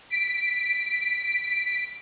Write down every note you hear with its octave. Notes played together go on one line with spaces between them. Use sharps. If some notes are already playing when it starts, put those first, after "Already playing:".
B6 D7